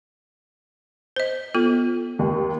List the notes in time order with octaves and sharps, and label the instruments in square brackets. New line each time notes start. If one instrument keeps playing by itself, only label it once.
[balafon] C5 D#5
B3 F4 A4
[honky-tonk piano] D#2